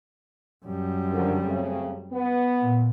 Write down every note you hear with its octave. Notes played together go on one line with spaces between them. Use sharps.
F#2 G3
D3 F3 A#4
C#3 A3 C4
B3
A#2